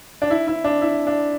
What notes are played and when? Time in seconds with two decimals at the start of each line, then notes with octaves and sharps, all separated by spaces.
0.22 D4
0.30 E4
0.47 E4
0.64 D4
0.81 E4
1.07 D4